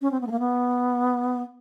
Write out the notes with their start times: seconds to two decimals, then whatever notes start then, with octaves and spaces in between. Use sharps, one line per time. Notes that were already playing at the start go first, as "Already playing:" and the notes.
0.02 C#4
0.11 C4
0.21 B3
0.27 A3
0.31 A#3
0.40 B3